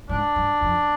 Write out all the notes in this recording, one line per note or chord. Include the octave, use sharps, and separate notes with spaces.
G#2 D4
G2
F2